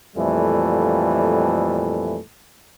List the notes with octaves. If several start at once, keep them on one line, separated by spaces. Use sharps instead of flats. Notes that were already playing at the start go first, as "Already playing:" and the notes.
F2 A#2 E3 G3 A3